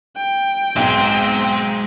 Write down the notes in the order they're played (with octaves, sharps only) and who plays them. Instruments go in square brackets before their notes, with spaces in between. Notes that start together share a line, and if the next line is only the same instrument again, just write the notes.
[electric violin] G5
[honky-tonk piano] B1 G#2 [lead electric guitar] G#3 [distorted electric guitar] C4